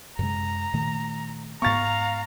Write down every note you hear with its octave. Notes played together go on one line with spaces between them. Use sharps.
F#2 C3 G#3 A#5
A#2 D#3 A3
G#2 B3 F5 A#5 C#6 A6